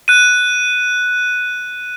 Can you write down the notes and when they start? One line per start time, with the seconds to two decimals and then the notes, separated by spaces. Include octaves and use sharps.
0.08 F#6 D#7